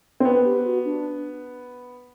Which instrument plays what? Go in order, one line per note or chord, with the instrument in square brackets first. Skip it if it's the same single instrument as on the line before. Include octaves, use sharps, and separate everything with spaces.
[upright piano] C4
[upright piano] B3 [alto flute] B4
[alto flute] G4
F#4
D4